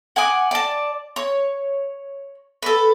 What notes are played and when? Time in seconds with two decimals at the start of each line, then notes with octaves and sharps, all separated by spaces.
0.16 F#5 G#5 D6 D#6
0.51 D5 A5
1.16 C#5
2.63 A4 B4